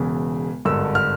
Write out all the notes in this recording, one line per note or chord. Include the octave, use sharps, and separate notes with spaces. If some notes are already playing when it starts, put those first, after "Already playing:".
Already playing: E1 E2 C#3
G#1 G2 D3 E6
F6